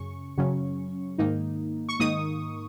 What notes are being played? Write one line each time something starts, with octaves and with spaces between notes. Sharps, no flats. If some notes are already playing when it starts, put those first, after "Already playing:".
Already playing: F#2 C#3 C#4 C#6
F#2 C#3 F#3 C#4
G#2 D#3 A#3 D#4
C#6
G#2 D#3 A#3 D#4 D#6